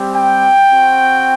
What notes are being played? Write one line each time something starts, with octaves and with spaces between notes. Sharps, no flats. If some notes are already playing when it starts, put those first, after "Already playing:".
Already playing: G3 C4 G4
G5
C4 F#4